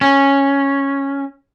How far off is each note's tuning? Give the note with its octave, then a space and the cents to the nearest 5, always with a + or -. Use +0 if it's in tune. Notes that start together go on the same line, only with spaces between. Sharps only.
C#4 -5